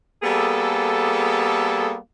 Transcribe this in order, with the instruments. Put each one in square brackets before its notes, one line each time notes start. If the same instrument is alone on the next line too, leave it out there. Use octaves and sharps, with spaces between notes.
[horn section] G3 A#3 B3 G#4 A4